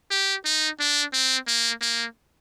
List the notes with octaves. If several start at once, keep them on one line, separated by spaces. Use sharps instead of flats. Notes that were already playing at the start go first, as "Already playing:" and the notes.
G4
D#4
D4
C4
A#3
A#3